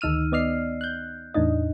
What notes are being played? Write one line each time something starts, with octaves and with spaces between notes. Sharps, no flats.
D2 D#3 D#4 E6 F6 D#7
B3 D5 D#5 F6 C7
F#6 G6
E2 A2 D4 D#4 D#5